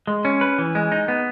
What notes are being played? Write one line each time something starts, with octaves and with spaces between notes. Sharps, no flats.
G#3
C#4
B4
E3
G#3
D#4
B3